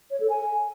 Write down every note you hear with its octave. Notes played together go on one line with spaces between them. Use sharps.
C#5
A4
G#5